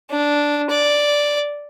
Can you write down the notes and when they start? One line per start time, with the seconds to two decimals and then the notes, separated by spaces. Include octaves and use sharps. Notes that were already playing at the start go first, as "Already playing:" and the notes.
0.10 D4
0.70 D5